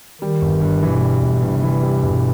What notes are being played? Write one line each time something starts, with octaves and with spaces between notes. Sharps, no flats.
D#3 G3
G1
G2
B2 E3
G3
G1
G2 C3
E3
G3
G1 B2